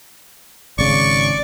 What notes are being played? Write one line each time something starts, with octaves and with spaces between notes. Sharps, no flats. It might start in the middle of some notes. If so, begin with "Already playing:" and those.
G#1 C#3 D5 C#6 D6